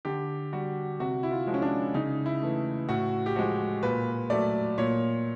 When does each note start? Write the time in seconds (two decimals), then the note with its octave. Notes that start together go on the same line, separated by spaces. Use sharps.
0.05 D3 G4
0.53 G3 F#4
1.00 C3 F#4
1.23 E4
1.31 F4
1.47 F3 G#3
1.54 C#4
1.62 D4
1.94 C#3 D#4
2.26 E4
2.42 E3 A3
2.89 A2 F#4
3.26 G4
3.36 F3 G#3 F#4
3.83 A#2 B4
4.30 F#3 A3 D5
4.78 A#2 C#5